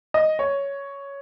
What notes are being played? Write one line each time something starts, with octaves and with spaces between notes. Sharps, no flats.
D#5
C#5